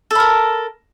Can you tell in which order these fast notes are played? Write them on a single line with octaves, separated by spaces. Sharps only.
A4 B5 A#4